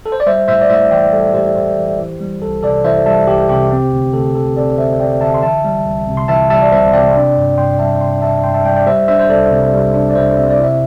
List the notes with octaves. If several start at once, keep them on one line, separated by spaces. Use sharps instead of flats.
A4
C5
D5
G3 C5 E5
A2 C5 E5
D5
A2 C5 E5
E3 D5 G5
G3 A4 D5
A2 G4 C5
A2 G4 C5
E3
E3
G3
C2 A4
C3 A4 D5
E3 C5 E5
G3 E5 A5
C2 G4
C3 G4
C4
D2
D2 A4
D3 A4
C4 A4 D5
D2 C5 E5
D2 D5 G5
D3 E5 A5
C6
E3 E5 A5
G3
C2
C3
C6
E3 E5 A5
G3 E5 A5
D5
C2 C5 E5
C3 D5 G5
D4
G2
G2 G5 C6
G3 E5 A5
D4 G5 C6
G2 E5 A5
G2 G5 C6
E5 A5
G3 D5 G5
D5 G5
G3 C5 E5
D4 C5 E5
C5
C2 A4 D5
C3
G3
D4
D5
C2 C5 E5
C3 E5
D5
E4 C5 E5